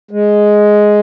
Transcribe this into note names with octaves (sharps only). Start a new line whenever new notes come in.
G#3